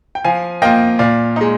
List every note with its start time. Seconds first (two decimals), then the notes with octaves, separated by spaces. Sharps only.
0.15 G5
0.24 F3 F5 G#5
0.62 A#3 F4 D#5 G5
0.99 A#2 D5 F5
1.36 G#3 D#4